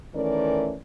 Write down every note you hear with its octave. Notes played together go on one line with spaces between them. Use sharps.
D#3 E3 A3 C#4 A#4 D5